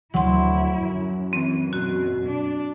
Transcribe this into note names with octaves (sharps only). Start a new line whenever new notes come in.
D2 F#3 E4 F#5 C6
F#2
E3 C4
B2 F#4
D4